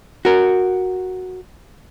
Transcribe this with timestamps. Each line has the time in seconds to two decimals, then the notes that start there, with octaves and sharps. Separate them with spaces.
0.25 F#4 A#4